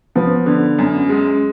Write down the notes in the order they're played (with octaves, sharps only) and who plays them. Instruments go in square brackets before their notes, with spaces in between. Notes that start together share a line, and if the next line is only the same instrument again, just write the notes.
[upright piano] F3 [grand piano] B3
[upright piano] D3
F#2
G#3